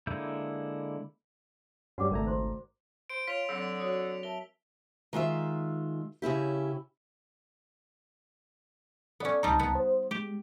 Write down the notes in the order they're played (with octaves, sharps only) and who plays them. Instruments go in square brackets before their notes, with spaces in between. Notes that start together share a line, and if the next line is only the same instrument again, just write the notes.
[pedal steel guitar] D3 G#3 A#3 E4 G6
[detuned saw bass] G2 [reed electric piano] G3 C#4 [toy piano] F#4 F#5 D6
[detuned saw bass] G#1 [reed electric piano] C#2 A3 A#5 [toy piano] A#4 D5
[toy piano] C5 C6
[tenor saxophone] C5 [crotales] D7
[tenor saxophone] F4 [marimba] C#5 [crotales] B6 D7 F7
[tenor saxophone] D3 [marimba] F#3 C4 [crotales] E6
[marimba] F#4 C#5 D#6
[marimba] A#4 E5 A5 [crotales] G7
[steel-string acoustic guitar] D#3 G#3 F4 E5
C#3 C#4 E4 G4
[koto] B3 C#4 [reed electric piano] A4 D5
[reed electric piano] C#2 A5 A#5 [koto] C3 G3 D#4
[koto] B3
[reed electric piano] C5
[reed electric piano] G#3 [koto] G4